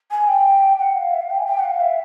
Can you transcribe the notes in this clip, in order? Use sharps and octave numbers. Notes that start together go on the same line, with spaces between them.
G#5
G5
F#5
F5
E5
F5
G5
G#5
G5
F#5
F5
E5